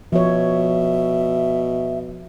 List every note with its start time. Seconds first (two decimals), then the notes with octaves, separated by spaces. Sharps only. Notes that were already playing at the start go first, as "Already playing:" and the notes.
0.12 B2 F3 C#5 E5